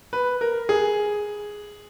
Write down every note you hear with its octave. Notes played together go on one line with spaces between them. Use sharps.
B4
A#4
G#4